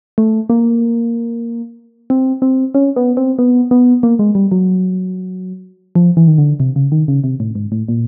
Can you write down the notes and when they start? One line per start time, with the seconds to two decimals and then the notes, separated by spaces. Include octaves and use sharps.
0.18 A3
0.50 A#3
2.10 C4
2.42 C4
2.75 C#4
2.96 B3
3.17 C4
3.39 B3
3.71 B3
4.03 A#3
4.19 G#3
4.35 G3
4.52 F#3
5.95 F3
6.17 E3
6.28 D#3
6.38 D3
6.60 C3
6.76 C#3
6.92 D#3
7.08 C#3
7.24 C3
7.40 A2
7.55 G#2
7.72 A2
7.88 A#2